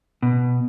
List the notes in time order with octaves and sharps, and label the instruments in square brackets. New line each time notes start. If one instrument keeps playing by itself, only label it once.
[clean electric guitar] B2